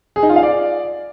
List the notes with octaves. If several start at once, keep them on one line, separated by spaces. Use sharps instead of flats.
G#4
D#4
F4
F5
D5